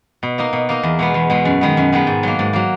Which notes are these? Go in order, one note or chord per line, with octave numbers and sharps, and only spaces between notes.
B2
A#3 D#4 A#4
B2
A#3 D#4 A#4
E2
B2 G#3 B3
E2
B2 G#3 B3
F#2
D#3 G#3 B3
F#2
D#3 G#3 B3
G#2
F#3 A#3
G#2
F#3 A#3